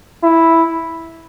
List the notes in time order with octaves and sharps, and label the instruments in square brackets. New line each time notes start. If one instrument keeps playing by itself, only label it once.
[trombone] E4